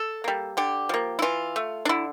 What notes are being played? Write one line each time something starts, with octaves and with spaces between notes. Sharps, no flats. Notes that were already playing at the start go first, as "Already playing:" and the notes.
Already playing: A4
G3 A#3
D3 G4
F3 A#3
E4
E3 F4
A3
D4
D3 E4